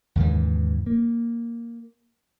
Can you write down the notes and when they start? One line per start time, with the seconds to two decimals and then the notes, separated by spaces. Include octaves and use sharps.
0.16 D#2 G#2 C#3 E3
0.86 A#3